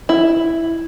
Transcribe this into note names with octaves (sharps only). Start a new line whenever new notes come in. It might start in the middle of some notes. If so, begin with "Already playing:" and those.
E4